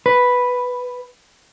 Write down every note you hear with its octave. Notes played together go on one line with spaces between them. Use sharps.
B4